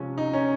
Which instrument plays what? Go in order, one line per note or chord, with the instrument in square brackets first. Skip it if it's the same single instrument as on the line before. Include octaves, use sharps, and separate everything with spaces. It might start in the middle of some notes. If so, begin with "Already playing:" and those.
Already playing: [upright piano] C3 F3 G#3 [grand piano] C#4
[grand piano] D#4
C#4